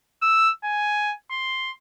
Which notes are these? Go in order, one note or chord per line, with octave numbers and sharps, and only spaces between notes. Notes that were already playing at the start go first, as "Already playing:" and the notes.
E6
G#5
C6